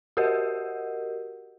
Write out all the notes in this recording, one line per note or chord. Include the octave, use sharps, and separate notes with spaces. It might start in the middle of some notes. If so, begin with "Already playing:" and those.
F#4 G4 A#4 D#5 F#5